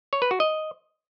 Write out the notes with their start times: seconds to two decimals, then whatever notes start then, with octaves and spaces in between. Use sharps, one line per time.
0.13 C#5
0.22 B4
0.31 F#4
0.40 D#5